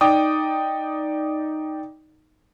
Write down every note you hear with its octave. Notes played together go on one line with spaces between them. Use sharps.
D#4 D5 G5 D6 D#6